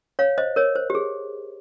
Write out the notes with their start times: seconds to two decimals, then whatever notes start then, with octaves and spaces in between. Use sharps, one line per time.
0.19 C#5 F5
0.38 C5 D#5
0.56 A#4 C#5
0.75 C5
0.90 G4
0.95 G#4